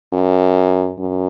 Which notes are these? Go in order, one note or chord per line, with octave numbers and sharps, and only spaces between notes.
F#2
F#2